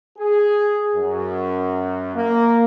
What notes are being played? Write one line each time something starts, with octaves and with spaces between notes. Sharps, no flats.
G#4
F#2
A#3